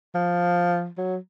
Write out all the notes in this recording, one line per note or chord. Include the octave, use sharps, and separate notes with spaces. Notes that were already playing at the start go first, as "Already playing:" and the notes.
F3
F#3